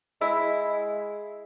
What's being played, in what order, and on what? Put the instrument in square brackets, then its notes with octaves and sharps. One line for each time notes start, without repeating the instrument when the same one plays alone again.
[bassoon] G#3 [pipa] E4